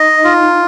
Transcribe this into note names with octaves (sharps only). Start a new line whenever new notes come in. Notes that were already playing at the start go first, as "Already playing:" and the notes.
Already playing: D#4 D#5
F4